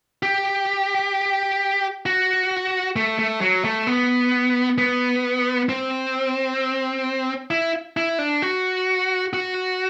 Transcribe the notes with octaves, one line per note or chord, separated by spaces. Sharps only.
G4
F#4
A3
A3
F#3
A3
B3
B3
C4
E4
E4
D4
F#4
F#4